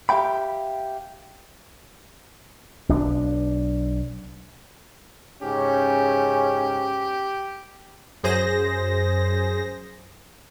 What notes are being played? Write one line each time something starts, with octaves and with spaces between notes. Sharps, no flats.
G4 E5 F5 G5 B5
B1 D4
G#2 C#3 C#4 G4
F#2 G#4 C5 A#6